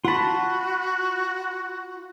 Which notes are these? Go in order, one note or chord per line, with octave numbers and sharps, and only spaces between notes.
F4 F#4 F#5 A5 B5